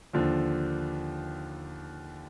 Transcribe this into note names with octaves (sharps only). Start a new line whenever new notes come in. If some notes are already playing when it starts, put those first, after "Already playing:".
D#2 D3 F3